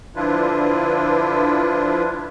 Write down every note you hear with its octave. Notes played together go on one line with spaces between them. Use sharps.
D3 F3 D4 E4 F4 B4